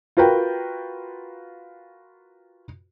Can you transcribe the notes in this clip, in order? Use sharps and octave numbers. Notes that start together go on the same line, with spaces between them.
F4 F#4 A#4 B4 G5